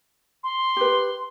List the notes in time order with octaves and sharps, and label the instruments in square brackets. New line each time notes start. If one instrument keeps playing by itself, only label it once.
[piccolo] C6
[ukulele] G4 B4